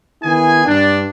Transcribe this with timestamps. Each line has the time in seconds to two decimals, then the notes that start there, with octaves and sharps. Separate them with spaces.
0.22 D#3 B3 E4 G#4 G#5
0.65 G2 D4